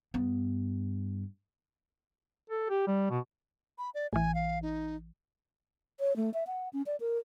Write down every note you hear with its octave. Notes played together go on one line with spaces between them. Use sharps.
G2 B3
A4
G4
G3
B2
B5
D5
A1 E3 G#5
F5
D#4
C#5
A3
E5
F#5
C#4
D5
A#4